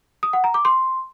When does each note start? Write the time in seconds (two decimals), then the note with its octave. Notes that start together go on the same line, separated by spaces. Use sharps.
0.23 D#6
0.33 F#5
0.44 A#5
0.54 D6
0.65 C6